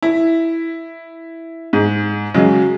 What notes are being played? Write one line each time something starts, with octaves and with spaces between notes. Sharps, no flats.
E4
G#2
C#3 F#3 G#3